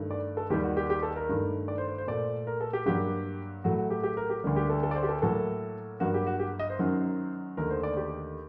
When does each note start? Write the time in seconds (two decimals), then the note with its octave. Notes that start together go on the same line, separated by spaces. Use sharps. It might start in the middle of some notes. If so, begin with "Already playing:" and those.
Already playing: G2 D#3 A3
0.11 D5
0.37 A4
0.50 D#2 D#3 G3 G4
0.64 F#4
0.77 G4
0.90 G4
1.03 A4
1.16 A#4
1.29 G2 D#3 A3
1.68 D5
1.78 C5
1.88 C5
1.98 C5
2.07 A#2 A3 D5
2.47 A#4
2.61 A4
2.73 G4
2.86 G2 F#3 A#3 G4
3.64 A2 F#3 A3 F#4
3.78 F#4
3.90 G4
4.03 G4
4.17 A#4
4.30 G4
4.44 D2 D3 G3 A#3
4.56 G4
4.70 A4
4.83 A4
4.91 D5
4.95 C5
5.03 G4
5.08 A4
5.22 A2 F#3 A#3 A4
6.00 G2 F#3 A#3 F#4
6.14 G4
6.27 F#4
6.40 G4
6.59 D#5
6.70 C5
6.79 F#2 D#3 F#3
7.57 D#2 D3 A3 A#4
7.71 C5
7.83 D5
7.97 G4